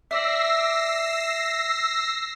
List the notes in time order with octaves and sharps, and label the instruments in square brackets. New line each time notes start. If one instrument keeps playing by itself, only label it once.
[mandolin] D5 E5 [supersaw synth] E6 A#6 C7